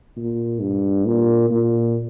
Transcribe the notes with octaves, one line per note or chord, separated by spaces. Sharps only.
A#2
G2
A#2
A#2